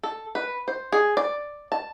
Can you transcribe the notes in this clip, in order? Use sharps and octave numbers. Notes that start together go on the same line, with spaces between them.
A4
B4
C5
G#4
D5
A5